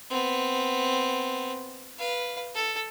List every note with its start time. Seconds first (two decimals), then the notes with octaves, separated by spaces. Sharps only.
0.10 B3 C4
1.99 B4 F5
2.55 A4